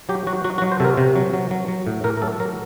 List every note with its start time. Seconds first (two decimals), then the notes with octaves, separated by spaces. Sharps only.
0.09 F#3 G4
0.27 F#3 F#4
0.44 F#3 F#4
0.58 F#4
0.62 F#3
0.72 C5
0.80 C3 A4
0.85 A#4
0.97 C3
1.16 F#3
1.33 F#3
1.51 F#3
1.68 F#3
1.87 A2
2.04 A2 A#4
2.17 A#4
2.22 F#3 A4
2.40 F#3 A#4